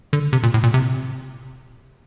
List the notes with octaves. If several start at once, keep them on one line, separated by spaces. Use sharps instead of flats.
D3
C3
A#2
A2
A#2
C3